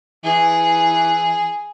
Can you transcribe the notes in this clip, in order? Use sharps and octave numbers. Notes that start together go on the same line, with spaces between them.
E3 G#4